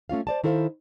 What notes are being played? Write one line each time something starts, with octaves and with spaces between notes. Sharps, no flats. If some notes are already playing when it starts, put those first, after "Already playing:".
A3 C#4 F4 F5
C5 D5 A5
D#3 E4 A4 C5 F5